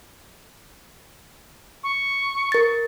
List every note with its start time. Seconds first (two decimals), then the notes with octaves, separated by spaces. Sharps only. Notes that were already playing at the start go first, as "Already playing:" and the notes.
1.83 C#6
2.52 A#4 A6